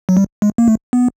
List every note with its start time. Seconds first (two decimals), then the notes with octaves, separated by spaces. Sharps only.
0.09 F#3
0.17 G3
0.42 G#3
0.58 A#3
0.68 A3
0.93 B3